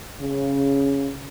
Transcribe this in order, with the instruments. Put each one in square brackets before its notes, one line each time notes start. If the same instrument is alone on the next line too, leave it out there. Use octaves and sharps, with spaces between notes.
[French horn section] C#3